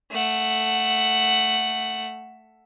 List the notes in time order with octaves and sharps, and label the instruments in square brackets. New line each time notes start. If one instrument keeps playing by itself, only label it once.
[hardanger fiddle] A3 F#5